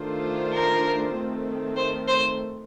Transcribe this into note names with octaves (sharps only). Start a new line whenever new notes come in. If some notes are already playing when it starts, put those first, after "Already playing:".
Already playing: D#3 A3 D4 F4 C5
A#4
D#3 A3 C4
C5
C5